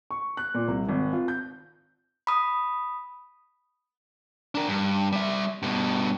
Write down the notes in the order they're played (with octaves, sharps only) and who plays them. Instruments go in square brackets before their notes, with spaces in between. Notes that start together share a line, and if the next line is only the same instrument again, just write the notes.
[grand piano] C#6
F#6
A#2
C2
G#1
F4
G6
[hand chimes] B5 D#6
[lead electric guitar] D4 A#4
G2
G3 E5
G2 B2